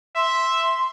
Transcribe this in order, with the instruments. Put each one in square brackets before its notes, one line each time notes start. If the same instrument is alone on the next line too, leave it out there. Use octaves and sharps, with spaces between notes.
[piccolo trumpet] E5 [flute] C6